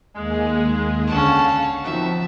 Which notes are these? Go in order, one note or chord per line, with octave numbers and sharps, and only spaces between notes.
D#2 G#3 A#3 G#4
C#2 D3 C#4 F5 F#5 A5
D#3 F3 C4 D#4 F#4 E5 A5